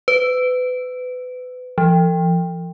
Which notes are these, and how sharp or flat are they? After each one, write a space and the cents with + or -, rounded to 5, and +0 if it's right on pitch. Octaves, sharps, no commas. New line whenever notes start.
B4 +30
F3 -40